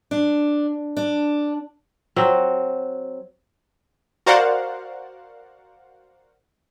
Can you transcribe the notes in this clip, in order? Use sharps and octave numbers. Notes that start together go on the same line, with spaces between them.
D4
D4
F#3 C4
F#4 A#4 C5 D5 F5 F#5